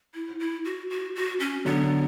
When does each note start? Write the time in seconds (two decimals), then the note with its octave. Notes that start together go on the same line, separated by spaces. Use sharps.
0.15 E4
0.40 E4
0.65 F#4
0.90 F#4
1.16 F#4
1.40 C#4
1.65 D3 F#3 B3